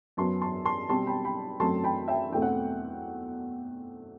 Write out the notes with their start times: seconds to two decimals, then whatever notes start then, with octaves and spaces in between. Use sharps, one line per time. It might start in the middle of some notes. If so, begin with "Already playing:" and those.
0.17 F#2 F#3 B3 A5 C6
0.42 A5 C6
0.65 A5 C6
0.89 B2 G3 C4 A5 C6
1.07 G5 B5
1.24 G5 B5
1.60 F#2 F#3 A3 C4 A5 C6
1.84 G5 B5
2.08 E5 G5
2.32 E2 B2 A3 C4 G5
2.42 F#5